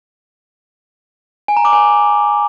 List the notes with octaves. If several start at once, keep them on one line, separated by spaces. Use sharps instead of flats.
G#5
A#5
D6
G#5